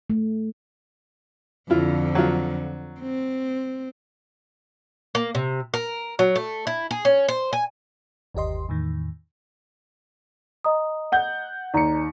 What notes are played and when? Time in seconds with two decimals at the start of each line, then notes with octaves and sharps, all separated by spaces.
0.10 A3
1.70 F2 D3 E4 F4
2.15 F#3 F4
3.00 C4
5.15 A#3
5.35 C3
5.74 A#4
6.19 F#3
6.36 A3
6.67 E4
6.91 G#4
7.05 C#4
7.28 C5
7.53 G#5
8.34 G1 D#2 G4 D#5 C6
8.69 E2 A2 D#3
10.64 D#5 A#5 D#6
11.12 F#5 G6
11.74 D#2 D5 A#5 C#7